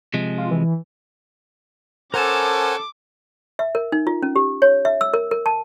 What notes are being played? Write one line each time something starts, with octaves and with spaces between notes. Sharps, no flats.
C3 F3 G#3
F4
E3
C#4 A4 A#4 C5 F#5 G#5 A5 D6
E5
A#4
D#4
F4
C#4
G4
C#5
E5
E6
A#4
A#4
A5